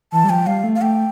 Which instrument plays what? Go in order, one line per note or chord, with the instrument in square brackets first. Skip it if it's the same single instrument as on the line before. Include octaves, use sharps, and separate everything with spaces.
[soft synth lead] E3 [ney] A5
[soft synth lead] G3
[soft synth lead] F3 [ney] G5
[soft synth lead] G3 [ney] F5
[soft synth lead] A3
[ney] F5
[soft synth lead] A3 [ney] G5